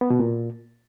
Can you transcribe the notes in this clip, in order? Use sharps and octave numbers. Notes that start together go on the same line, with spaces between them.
B3
B2
A#2